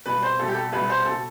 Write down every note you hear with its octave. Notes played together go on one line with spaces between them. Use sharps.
C2 B2 B4
C5
C2 B2 A4
G4
A4
C2 B2 B4
C5
B2 A4